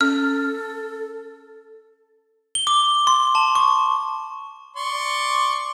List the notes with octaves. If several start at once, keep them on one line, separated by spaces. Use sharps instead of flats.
C#4 A4 F6
G7
D6
C6
A5
C#6
D5 C6 C#6